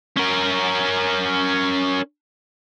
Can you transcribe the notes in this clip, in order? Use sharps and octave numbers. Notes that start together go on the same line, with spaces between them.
C#4 A#4